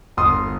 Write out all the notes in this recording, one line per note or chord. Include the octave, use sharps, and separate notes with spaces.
G1 C6 D#6